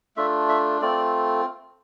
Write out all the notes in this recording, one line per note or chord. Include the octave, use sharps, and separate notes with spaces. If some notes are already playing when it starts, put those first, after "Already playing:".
A3 D4 F4 E5
E5
A3 C4 F4 D5